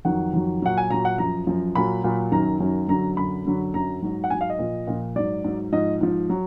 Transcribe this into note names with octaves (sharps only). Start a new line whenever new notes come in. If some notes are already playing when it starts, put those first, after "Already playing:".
F2 D#3 F#3 F#5
F2 D#3 F#3
A#2 F#3 F#5
G#5
A#2 F#3 A#5
F#5
F#2 F3 A#5
F#2 F3
A#2 F#3 B5
A#2 F#3
F#2 D#3 F#3 A#5
F#2 D#3 F#3
F#2 D3 F#3 A#5
F#2 D3 F#3 B5
F#2 D3 F#3
F#2 D3 F#3 A#5
G#2 F#3
F#5
G#2 F#3 G#5
F5
D#5
A#2 F3
A#2 F3
G#2 F#3 D5
G#2 F#3
G#2 F3 D#5
G#2 F3
F#3